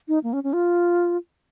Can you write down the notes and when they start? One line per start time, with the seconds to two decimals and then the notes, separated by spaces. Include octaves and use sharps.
0.08 D#4
0.24 A#3
0.33 C#4
0.44 C#4
0.53 F4